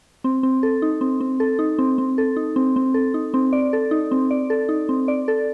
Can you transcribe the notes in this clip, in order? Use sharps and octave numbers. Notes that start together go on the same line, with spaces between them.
C4
C4
A4
D#4
C4
C4
A4
D#4
C4
C4
A4
D#4
C4
C4
A4
D#4
C4
D5
A4
D#4
C4
D5
A4
D#4
C4
D5
A4